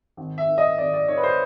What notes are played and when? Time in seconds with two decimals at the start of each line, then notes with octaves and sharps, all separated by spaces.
0.17 G#1
0.38 E5
0.48 D#3
0.58 D#5
0.78 G#1 D5
0.93 D5
1.08 D#3 C#5
1.17 B4
1.23 C5